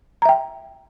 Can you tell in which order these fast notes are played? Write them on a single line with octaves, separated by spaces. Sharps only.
A#5 E5 G5